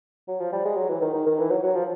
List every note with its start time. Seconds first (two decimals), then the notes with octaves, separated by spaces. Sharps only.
0.28 F#3
0.41 F3
0.53 G3
0.65 G#3
0.77 F#3
0.89 E3
1.02 D#3
1.14 D#3
1.26 D#3
1.39 E3
1.51 F#3
1.63 F#3
1.76 F3